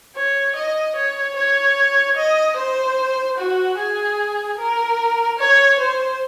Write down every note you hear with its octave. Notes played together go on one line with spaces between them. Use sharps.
C#5
D#5
C#5
C#5
D#5
C5
F#4
G#4
A#4
C#5
C5